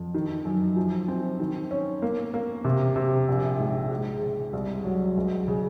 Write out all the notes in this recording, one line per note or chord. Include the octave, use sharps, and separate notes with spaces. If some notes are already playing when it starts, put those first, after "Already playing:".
Already playing: F2
D#3
F#2
F3
C4
D#3
C#4
A#3
A#3
C3
C3
A#1
G#2
G#3
C#3
C2
F#3
C#2
C#3